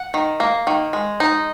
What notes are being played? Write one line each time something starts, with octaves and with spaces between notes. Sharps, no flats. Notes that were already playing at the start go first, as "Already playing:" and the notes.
Already playing: F#5
D#3
A#3
D#3
G#3
D#4